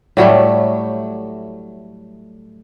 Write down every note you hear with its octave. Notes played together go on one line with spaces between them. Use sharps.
A2 F#3 G3 A3